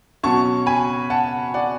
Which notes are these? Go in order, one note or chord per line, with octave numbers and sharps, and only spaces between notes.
B2 F#3 C#4 A5 C#6
G#5 B5
F#5 A5
D5 F#5